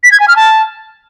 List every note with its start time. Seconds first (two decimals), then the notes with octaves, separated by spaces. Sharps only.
0.04 B6
0.12 G#6
0.20 G#5
0.28 F6
0.36 A5